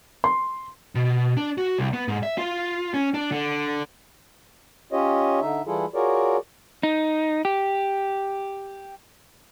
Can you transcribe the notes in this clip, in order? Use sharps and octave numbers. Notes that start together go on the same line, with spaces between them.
C6
B2
D4
F#4
C2
B3
G#2
E5
F4
C#4
D4
D3
C#4 F4 G4 C#5 D#5
D3 D#4 E5
E3 G3 E4 F4 G#4 A4
F4 F#4 G#4 A#4 C#5 D5
D#4
G4